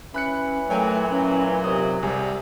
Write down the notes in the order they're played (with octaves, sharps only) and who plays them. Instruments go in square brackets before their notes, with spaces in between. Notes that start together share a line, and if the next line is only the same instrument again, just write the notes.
[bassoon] E3 [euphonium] C#4 [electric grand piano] B5 F#6 C#7
[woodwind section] A#2 F#3 [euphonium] A3 [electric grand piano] C#5 G5 G#5
[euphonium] C#4
[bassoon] D#2 [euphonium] C3 [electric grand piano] D#6
[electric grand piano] C2 C3 [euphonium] G3 [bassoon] G#4